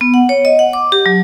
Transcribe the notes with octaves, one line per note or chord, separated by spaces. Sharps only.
B3
F#5
C#5
D#5
F#5
D6
G4
F#3